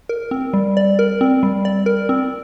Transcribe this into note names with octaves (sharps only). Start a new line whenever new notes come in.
A#4
C4
G3
D5
A#4
C4
G3
D5
A#4
C4